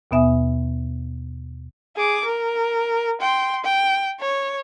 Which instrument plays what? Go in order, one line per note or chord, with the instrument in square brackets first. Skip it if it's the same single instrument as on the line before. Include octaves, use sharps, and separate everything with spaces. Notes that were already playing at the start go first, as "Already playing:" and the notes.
[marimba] D#2 B2 B3 E5 G#5 D#6
[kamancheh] G#4 D6
A#4
G5 C6
G5
C#5